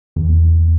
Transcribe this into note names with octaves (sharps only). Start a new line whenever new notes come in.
E2